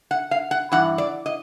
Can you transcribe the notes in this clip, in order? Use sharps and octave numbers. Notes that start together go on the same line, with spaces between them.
F#5
F5
F#5
G2 E3 F#5
D5
D#5